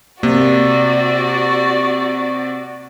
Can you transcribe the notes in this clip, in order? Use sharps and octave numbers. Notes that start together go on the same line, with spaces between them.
C3 A#3 F#4 D5